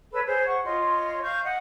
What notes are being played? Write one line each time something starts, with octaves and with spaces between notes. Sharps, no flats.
A4 B4 C#5 B5
G#4 C5 C#5
F#5 C#6
F4 C#5 D#5 C6
F5 C#6 G6
D#5 F#5